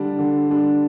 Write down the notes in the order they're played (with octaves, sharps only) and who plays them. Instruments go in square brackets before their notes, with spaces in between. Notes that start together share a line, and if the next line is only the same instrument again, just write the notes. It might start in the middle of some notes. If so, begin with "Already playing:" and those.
Already playing: [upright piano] D3 G3 D4
D3
G3 D4